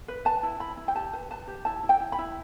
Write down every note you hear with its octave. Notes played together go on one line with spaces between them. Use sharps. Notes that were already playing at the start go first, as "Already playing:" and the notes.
B4
B4 A5
E4
E4 B5
E4
G5
G4 A5
B4
B4 A5
G4
E4 A5
E4
G5
E4
B5
E4